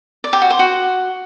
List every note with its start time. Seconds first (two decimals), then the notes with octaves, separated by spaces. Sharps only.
0.24 D5
0.33 G4
0.42 F#4
0.50 C5
0.59 F#4